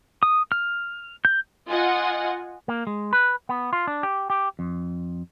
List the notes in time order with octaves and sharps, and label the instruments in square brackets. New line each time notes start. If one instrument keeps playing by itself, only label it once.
[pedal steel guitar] D#6
F6
G6
[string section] F4 D#5 F#5 G#5
[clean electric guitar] A#3
G#3
B4
B3
F4
D4
G4
G4
F2